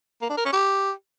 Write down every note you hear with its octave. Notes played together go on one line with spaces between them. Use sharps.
A#3
D4
A#4
C#4
G4